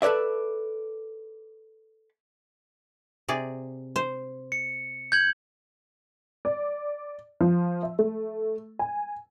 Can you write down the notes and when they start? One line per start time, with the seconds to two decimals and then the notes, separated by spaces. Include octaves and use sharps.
0.02 A4 B4 C#5 D5 E5
3.29 C3 G#4 D5
3.96 C5
4.52 C#7
5.12 G6 G#6 F#7
6.45 D5
7.41 F3
7.83 E5
7.99 A3
8.79 G#5